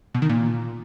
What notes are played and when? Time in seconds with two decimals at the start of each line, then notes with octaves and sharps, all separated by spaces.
0.14 B2
0.22 D#3
0.30 A#2